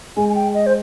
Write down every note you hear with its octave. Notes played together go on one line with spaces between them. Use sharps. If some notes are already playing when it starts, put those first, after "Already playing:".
G#3 G#5
G#5
G5
D#5
C5